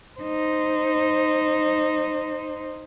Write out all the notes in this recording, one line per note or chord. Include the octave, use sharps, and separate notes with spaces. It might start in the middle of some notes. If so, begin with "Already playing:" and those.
D#4 C5